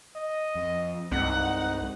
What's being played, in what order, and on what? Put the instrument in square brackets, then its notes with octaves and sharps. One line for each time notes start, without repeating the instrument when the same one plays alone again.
[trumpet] D#5
[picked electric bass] F2
[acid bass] C2 [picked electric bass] G2 G#3 C4 [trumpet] D#4 [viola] F#5